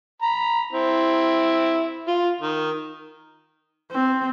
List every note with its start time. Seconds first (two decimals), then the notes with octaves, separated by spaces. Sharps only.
0.22 A#5 B5
0.72 C4 E4
2.08 F4
2.40 D#3
3.91 C4